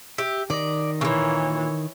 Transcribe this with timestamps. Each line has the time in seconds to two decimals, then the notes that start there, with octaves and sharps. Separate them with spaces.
0.18 G4 E5
0.50 D#3 D5 D#5
1.01 A#2 C#3 E3 C#5